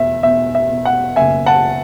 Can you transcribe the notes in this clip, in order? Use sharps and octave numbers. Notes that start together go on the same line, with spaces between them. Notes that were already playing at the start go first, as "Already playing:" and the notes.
Already playing: E2 B2 E5
B2 E5
E5
B2
F#5
F#1 E5 G#5
F#5 A5